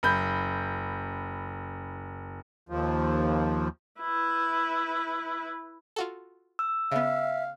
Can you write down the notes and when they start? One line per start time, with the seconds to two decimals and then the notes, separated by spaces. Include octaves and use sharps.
0.03 F#1 B5 G6
2.69 D#2 F3
4.00 E4 B4
5.96 F4 F#4 A4
6.59 E6
6.92 C#3 B3 E5 F5